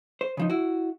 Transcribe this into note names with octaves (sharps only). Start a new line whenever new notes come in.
C5
C#3 F3 D#4
E4 F#4